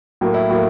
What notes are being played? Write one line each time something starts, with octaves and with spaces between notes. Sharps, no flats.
A2 F#3 A#3
E4
A2 F#3 A#3